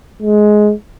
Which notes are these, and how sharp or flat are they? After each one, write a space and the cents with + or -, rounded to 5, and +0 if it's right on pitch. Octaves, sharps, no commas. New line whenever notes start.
G#3 +15